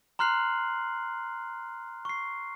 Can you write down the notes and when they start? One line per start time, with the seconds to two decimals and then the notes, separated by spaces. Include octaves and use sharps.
0.19 A#5 C6 F6 F#6 C7 F#7
2.05 C#6 C7